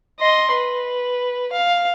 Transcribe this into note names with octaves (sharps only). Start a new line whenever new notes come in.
D#5 C6
B4
F5